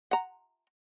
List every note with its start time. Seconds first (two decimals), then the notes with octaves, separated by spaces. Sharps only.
0.11 F#5 A#5